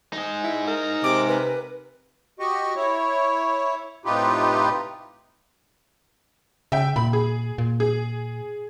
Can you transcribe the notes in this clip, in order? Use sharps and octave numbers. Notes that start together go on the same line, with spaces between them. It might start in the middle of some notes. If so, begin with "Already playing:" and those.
D#4 G#4
E4
A#4
C3 D6
B4
F#4 G4 D#5 C#6
E4 C#5
A2 C3 D#4 F4 G4 B4
C#3 E5 G5
A#2 B5
G#4
A#2
G#4